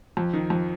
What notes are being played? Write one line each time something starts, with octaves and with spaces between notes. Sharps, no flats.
F2
D#3
F2